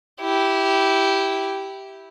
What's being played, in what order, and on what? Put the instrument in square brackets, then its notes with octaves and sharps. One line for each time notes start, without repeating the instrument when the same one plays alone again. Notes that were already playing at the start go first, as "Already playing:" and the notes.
[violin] E4 G4